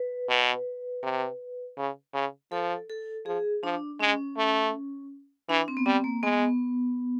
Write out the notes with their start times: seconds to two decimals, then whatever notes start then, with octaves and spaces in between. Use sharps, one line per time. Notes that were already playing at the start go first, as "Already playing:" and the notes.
Already playing: B4
0.29 B2
1.03 C3
1.78 C#3
2.14 C#3
2.52 F3 A4
2.90 A4
3.26 F3 G#4
3.63 F3 D4
4.00 G#3 C#4
4.38 A3
5.49 E3 D4
5.68 C4
5.77 B3
5.86 G3 C4
6.04 A#3
6.23 G#3 B3